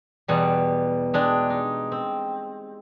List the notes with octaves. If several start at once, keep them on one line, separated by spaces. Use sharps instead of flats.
E2 B2 G3
G#3 D4 G4
D#4
C4